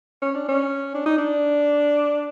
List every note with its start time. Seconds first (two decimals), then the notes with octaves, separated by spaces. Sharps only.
0.22 C#4
0.35 D4
0.49 C#4
0.95 D4
1.06 D#4
1.18 D4